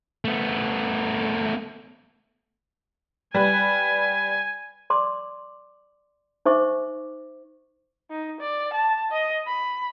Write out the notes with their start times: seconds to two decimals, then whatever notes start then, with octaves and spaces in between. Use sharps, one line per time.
0.25 A3 B3
3.35 G3 B4 G#5
4.90 D5 C6 D6
6.45 D#4 C5 E5 C#6 D6
8.10 D#4
8.41 D5
8.73 A5
9.12 D#5
9.47 B5